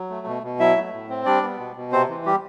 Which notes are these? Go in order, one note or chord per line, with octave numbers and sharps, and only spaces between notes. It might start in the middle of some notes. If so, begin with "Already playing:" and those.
Already playing: F#3
A3
B2
B2
F#3 E4 E5
A3
A2
C4
G3 D4 D5
B3
B2
B2
C3 C4 C5
E3
G3 G4